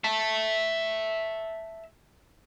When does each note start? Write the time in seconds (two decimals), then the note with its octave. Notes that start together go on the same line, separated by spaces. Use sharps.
0.04 E5 A5